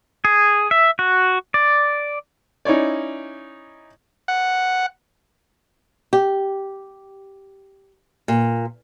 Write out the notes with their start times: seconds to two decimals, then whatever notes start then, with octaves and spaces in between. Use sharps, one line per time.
0.25 G#4
0.71 E5
0.99 F#4
1.54 D5
2.65 C#4 D#4 E4 C#5 D5
4.28 F#5
6.13 G4
8.28 A#2